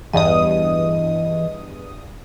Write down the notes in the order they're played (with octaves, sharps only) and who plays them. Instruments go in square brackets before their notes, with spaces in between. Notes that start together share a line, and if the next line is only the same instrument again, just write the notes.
[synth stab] E2 G2 D#6 [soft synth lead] E3 [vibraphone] D#5